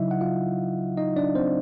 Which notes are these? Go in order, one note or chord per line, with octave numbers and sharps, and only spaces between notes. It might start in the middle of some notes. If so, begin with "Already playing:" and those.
Already playing: C#3 F#3 D#4 E4 D#5 E5
F#5
F4 F5
D#4 D#5
D4 D5
C4 C5